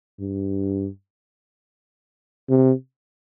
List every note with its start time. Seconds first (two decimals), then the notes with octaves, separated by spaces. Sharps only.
0.20 G2
2.49 C3